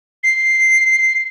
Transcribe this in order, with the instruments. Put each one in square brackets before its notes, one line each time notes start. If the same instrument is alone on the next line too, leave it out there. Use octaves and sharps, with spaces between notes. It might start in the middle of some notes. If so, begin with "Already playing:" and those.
[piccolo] C7